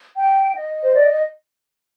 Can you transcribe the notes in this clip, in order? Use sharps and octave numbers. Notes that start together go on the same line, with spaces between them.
G5
D#5
C5
D5
D#5